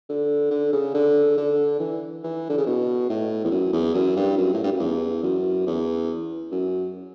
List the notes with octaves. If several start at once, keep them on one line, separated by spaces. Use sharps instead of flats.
D3
D3
C#3
D3
D3
E3
E3
D3
C#3
B2
A2
E2
F#2
E2
F#2
G2
F#2
A2
G2
F#2
E2
F#2
E2
F#2